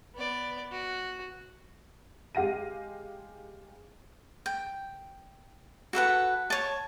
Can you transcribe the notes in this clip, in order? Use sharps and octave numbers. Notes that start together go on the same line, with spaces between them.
B3 D5
F#4
G#3 G4 F5 A#6 D#7
G5
F#4 A4 B4 F#5
C#5 A5